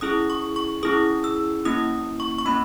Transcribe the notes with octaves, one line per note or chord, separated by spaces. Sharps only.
C#4 E4 G#4 D#6
C#6
C#6
C#4 E4 G#4 D#6
E6
A#3 C#4 E4 D#6
C#6
C#6
A#3 C#4 B5